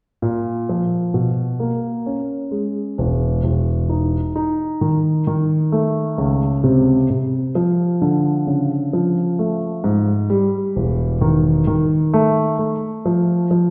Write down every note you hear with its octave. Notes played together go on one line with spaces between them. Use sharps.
A#2
F3
B2
A#3
C#4
G#3
E1
E1
D#4
D#4
D#3
D#3
A3
C#2
C3
C3
F3
D3
C#3
F3
A3
G#2
G3
E1
D#3
D#3
A3
A3
F3
F3